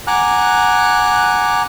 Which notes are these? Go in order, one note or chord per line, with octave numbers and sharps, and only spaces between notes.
F#5 G#5 A#5 D6 F#6